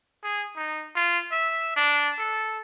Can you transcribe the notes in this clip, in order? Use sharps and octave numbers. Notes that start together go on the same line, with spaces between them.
G#4
D#4
F4
E5
D4
A4